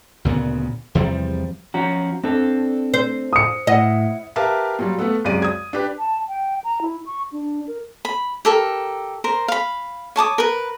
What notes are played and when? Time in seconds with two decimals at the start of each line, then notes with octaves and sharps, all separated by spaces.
0.25 D2 A#2 C#3 B3
0.95 E2 C3 F3 G3
1.74 F3 C#4 F#4 A#5
2.24 C4 D4 A4
2.94 C5
3.33 D#6 C#7
3.67 A2 E4 D#5 F#5
4.36 G4 A#4 B4 E5 F5 A5
4.79 A#2 F#3 G3
4.98 A3 B3 A4
5.24 C#2 F#2 C3 G#3 D5 D#7
5.42 D#6 G#6
5.73 D4 G4 B4
5.99 A5
6.28 G5
6.64 A#5
6.82 E4
7.06 C#6
7.32 D4
7.67 A#4
8.05 B5
8.45 G4 A4 A#4
9.24 A#4 C5 A#5
9.48 F5 B5
10.16 C#5 A5 D6 D#6
10.38 A#4 B4